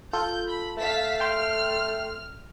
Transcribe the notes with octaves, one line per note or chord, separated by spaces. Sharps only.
F4 A4 G6
B5
A3 F5 A5 B6
G5 C6 F6